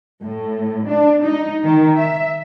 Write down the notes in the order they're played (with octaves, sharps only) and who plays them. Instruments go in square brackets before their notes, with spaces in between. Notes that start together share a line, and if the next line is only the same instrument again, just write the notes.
[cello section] A2
D4
D#4
D#3
E5